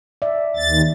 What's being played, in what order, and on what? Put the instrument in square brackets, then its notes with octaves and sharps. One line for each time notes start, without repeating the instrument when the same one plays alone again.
[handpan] D5 E5
[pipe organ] D#2 A6